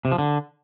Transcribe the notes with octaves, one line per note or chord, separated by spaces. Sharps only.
C3
F3
D3